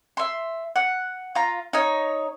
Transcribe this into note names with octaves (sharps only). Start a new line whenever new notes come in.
E5 C6
F#5
F4 A#5
D#4 C#5